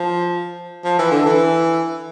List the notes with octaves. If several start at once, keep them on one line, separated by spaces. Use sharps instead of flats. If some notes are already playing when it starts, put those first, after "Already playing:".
Already playing: F3
F3
E3
D3
E3